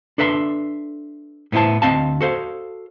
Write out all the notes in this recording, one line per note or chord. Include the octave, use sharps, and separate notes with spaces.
D4 A4 B4 E5 A5 C6
A2 B3 E4 C5 A5
D2 C4 D#5 F5 A5
F#4 A4 C5 F5